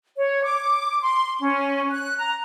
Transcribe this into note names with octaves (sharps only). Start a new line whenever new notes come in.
C#5
D6
C6
C#4
F#6
A#5